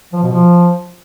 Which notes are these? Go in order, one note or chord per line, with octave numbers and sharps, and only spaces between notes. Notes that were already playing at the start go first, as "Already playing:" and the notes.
F3
B2
F3